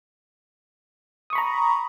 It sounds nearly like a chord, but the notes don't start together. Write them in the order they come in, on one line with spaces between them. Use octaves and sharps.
D#6 C#6 B5 A#5